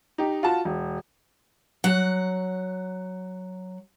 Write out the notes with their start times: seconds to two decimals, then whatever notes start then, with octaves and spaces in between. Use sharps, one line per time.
0.18 D#4 G4
0.43 F4 F#4 A5
0.65 E1
1.84 F#3 F#5